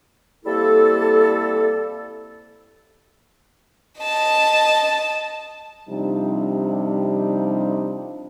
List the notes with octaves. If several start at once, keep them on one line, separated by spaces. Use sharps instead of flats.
C3 G3 A#3 E4 A4
D#5 A5
C3 F3 G3 D4 D#4